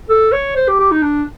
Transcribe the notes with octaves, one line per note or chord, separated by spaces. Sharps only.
A4
C#5
C5
G4
G4
D#4
D4